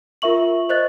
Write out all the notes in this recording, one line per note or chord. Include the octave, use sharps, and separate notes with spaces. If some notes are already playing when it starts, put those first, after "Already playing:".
F4 A#4 E5 C#6 F#7
C5 D#5 F#6 A6